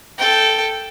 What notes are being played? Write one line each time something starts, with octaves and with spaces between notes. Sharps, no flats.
A4 G5